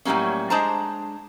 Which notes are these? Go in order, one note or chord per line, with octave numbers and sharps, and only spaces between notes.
A2 F#3 G3 A#3 C#4
G#3 D4 C5 A5 A#5